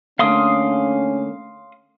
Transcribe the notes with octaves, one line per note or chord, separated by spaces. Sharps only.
D3 A3 A#3 C#4 F5 C6 D#6